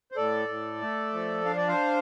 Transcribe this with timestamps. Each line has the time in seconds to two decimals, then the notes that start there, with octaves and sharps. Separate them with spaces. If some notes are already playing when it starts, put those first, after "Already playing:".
0.12 C5
0.16 A2 A4 D5
0.49 A2
0.81 A3
1.13 F3
1.45 D4 F5
1.57 D5
1.68 C5 F5